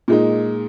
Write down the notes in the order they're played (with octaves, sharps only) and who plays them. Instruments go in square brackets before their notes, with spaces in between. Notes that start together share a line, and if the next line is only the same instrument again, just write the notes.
[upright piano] A#2 G#3 D#4